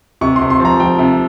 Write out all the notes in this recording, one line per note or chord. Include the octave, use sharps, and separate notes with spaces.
C3 C#6
C6
C3
C6
F3 A#5
F3 G5
C3